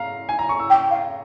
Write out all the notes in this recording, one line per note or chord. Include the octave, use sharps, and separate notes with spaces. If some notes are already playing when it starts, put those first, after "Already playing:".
Already playing: F5 A#5
G#5
A#5
C#6
E6
G5
F5